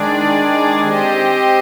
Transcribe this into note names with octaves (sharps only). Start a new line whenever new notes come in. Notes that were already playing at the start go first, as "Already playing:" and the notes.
Already playing: D#3 G#3 D4 G#4 D5
C4 G4 C5 D#5